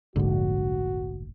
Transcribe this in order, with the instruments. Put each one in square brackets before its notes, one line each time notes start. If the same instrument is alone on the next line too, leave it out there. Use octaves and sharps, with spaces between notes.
[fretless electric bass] F1 A#1 [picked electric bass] G#2 D3 [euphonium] F#4